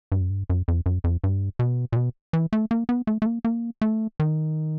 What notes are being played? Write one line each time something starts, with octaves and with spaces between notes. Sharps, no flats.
G2
F#2
G2
F#2
F2
F#2
F2
G2
B2
A#2
B2
E3
A3
A#3
B3
A3
A3
A#3
A#3
A3
D#3